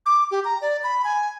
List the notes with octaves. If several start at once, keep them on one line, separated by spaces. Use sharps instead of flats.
D6
G4
A#5
D5
B5
G#5